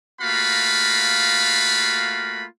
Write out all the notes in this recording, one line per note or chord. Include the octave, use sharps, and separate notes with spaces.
A3 A#3 F4 F#4 F5 B5